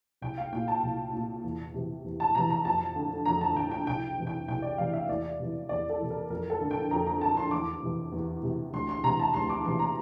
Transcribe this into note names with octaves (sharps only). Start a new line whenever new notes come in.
C2 G5
F5
A#2 G5
A5
C2
A#2
E2
C3 E3
E2
A5
C3 E3 A#5
A#5
F2 A5
D3
F2 A#5
A5
D3 G5
G5
C2 G5
C3 E3
G5
C2 G5
D5
C3 E3 F5
E5
E2 D5
C3 E3
E2 D5
A4
C3 E3
A#4
F2 A#4
A4
D3
G5
F2 A#5
A#5
D3 A5
C6
E2 D6
C3 E3
E2
C3 E3
D2 C6
C6
C3 E3 A#5
A5
D2 C6
D6
C3 E3 C6
A#5